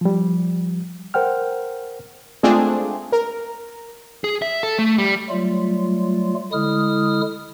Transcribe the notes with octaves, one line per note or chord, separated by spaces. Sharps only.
F3 G3
A#4 C5 F#5 G5 F6
G#3 A3 C4 D4 F4 G#4
A#4
G#4
E5
A4
A3
G3
F#3 G3 A3 F4
D3 G#3 E4 D#6 F6